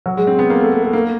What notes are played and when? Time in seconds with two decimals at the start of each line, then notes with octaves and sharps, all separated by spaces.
0.06 F#3
0.17 G#3
0.27 C4
0.39 B3
0.50 A#3
0.60 A3
0.72 A3
0.82 A3
0.93 A#3